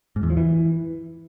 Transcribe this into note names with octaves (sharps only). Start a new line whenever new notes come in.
G#2
E2
F3
E3